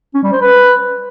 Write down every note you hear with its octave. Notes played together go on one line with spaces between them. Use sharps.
C#4
G3
C5
B4